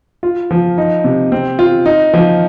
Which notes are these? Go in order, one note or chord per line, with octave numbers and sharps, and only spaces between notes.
F4
F3
D#4
C3
C4
F4
D#4
F3